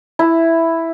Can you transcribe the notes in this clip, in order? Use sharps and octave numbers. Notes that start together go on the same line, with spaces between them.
E4